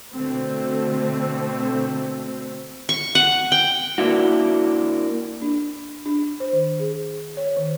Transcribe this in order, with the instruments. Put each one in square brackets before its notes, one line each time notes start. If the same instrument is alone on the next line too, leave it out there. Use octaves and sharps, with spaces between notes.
[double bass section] B2 D3 A3 C4
[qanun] C#6
F#5
G5
[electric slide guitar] A#3 D4 E4 F#4
[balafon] D4
D4
C5
D#3
G#4
C#5
D#3